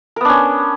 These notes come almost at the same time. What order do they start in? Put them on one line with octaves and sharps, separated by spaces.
A#4 B3 D4 C#4